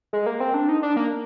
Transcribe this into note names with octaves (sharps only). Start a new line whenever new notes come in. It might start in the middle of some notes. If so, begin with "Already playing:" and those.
G#3
A#3
C4
D4
D#4
D4
A#3